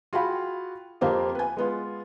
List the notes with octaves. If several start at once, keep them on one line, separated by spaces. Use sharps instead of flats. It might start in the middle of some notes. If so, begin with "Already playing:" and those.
F4 F#4 G#4 F5 G5 B5
F2 A#3 C4 G4 F5
B4 G#5
G#3 B3 F4